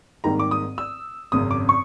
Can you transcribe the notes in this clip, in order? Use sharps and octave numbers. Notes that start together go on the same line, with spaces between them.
G#1 G#2 D#3 G3 A#3 A#5
D6
D#6
E6
G#1 F#2 C#3 D#6
D6
C#6